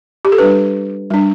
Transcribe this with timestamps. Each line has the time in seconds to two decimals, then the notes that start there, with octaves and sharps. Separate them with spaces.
0.25 G4
0.32 A4
0.38 G3 D4 B4
1.10 G3 D4